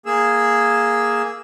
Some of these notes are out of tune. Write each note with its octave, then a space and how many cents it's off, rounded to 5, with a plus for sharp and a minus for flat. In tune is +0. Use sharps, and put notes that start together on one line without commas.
A#3 +0 G#4 +0 E6 +0